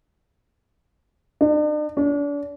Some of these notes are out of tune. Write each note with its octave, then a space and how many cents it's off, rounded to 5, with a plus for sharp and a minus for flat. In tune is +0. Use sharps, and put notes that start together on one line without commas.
D4 +45
D4 -35